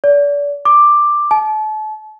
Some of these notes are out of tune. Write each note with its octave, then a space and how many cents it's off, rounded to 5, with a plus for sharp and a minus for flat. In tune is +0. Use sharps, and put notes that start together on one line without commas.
D5 -35
D6 +10
A5 -35